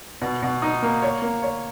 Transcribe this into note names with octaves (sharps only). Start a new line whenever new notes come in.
B2
B2
D#4
A#3
C#5
A#3
C#5